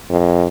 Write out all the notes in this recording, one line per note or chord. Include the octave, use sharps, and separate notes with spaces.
F2